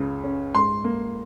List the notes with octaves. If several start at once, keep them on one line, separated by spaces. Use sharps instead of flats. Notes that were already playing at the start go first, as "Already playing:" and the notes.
Already playing: C#2 C#3
C#4
G#2 C6
A#3